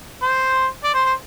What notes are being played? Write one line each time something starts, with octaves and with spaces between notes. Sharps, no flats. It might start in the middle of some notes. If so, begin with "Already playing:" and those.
C5
D5
C5
C5